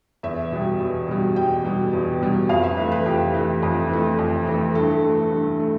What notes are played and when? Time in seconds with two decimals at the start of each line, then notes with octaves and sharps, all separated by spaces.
0.23 E2 E5
0.51 B2 G3
0.80 E2
1.08 B2 G3
1.36 E2 G5
1.64 B2 G3
1.93 E2
2.21 B2 G3
2.49 F2 F5
2.64 E5
2.77 E3 A3 B4
2.92 B4
3.06 F2 G4
3.34 E3 A3
3.63 F2
3.90 E3 A3
4.19 F2
4.47 E3 A3
4.75 G2 A4
5.03 E3 A3
5.32 G2
5.60 A3